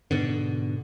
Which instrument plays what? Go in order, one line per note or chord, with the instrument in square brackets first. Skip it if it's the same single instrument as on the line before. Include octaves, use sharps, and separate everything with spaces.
[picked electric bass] G#2 B2 D3